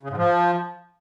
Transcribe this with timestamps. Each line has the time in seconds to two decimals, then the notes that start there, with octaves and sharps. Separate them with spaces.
0.03 C#3
0.10 G#2
0.17 F3